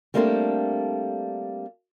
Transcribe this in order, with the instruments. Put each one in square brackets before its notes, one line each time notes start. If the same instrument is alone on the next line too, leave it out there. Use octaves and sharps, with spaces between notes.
[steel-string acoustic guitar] G3 A3 A#3 C4 D4 A4